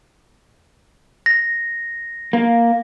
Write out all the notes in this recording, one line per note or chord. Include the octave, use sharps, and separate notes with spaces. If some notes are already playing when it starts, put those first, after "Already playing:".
A#6
A#3